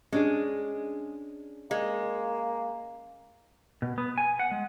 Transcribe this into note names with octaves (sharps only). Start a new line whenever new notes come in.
G#3 C#4 D4 G#4
G#3 A#3
B2
B3
G#5
F#5
G#3